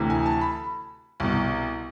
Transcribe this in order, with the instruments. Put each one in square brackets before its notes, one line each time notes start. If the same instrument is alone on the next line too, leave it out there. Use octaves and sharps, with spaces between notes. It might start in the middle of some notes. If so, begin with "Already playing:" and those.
Already playing: [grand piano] D2 C3 E3
G#5
A5
B5
C2 B2